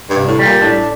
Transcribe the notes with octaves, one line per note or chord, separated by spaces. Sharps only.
G2
C2
A2
G3
A#2
A2 D4